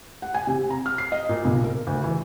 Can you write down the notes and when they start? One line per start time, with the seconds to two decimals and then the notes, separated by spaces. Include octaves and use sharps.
0.22 F#5
0.34 G#5
0.47 C3
0.70 A#5
0.86 F6
0.98 C7
1.12 D#5
1.29 A#2
1.45 B1
1.64 A#4
1.87 D2
2.04 E3